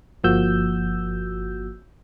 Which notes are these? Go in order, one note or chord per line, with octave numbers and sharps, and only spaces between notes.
G1 F3 A#3 F#4 E6 G6